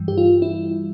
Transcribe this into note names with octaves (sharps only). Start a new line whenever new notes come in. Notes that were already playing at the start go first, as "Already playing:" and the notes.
Already playing: G2 E3 G3
G4
F4
E4